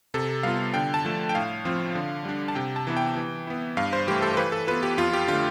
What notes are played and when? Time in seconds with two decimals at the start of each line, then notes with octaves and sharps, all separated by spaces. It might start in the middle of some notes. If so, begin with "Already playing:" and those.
0.14 C3 A4
0.43 G3 B3 F4 F5
0.74 D3 G5
0.94 A5
1.05 F3 A3
1.29 G5
1.35 A2 F5
1.65 F3 C4 F4
1.95 D3
2.25 G3 D4
2.48 A5
2.55 C3 G5
2.76 A5
2.87 E3 B3 E4
2.97 G5
3.16 E3
3.47 B3 E4
3.77 G2 F5
3.93 C5
4.07 E3 A3 E4 G4
4.22 A4
4.34 C5
4.37 E3 B4
4.52 A4
4.67 B3 F4 B4
4.83 G4
4.98 F2 F4
5.13 G4
5.28 D3 F4
5.33 A3